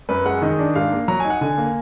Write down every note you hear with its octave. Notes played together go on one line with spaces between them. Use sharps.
F#2 B4
G#3 F#5
D#3 D#5
D4
G#2 F5
A#3
F#3 A#5
D#4 G#5
F#5
D3 G#5
A#3